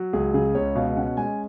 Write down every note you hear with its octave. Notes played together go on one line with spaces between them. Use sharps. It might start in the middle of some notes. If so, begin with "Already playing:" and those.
Already playing: F#3
C#2 G#4
C#3 G#4
C#2 C#5
B2 F5
C#4 F#5
G#3 G#5